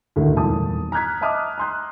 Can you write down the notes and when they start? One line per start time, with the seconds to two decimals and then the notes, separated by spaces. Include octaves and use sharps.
0.16 D2 A2 D3 D#3
0.35 D#1 E2 G#2 D#3 A5 D#6
0.92 A#5 F6 F#6 G#6 B6
1.21 D#5 E5 A5 D6 D#6 F6
1.58 A#5 C6 F#6